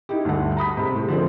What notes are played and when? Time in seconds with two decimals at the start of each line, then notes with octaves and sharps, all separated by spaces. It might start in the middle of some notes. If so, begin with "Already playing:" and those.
0.09 D#4 E4 G4
0.25 D2 G2 D3 F#5
0.57 A#5 B5 D#6 B6
0.76 C3 G#3
0.95 A2
1.08 D3 F3 G#3 C4